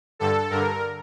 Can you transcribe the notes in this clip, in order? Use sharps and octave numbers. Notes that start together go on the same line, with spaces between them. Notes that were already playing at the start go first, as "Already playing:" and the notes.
G2 D3 A4
G2 D3 A#4